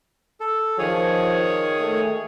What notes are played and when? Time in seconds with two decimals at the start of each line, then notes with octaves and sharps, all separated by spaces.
0.40 A4
0.78 D#3 F3 G#4 C#5
1.80 A3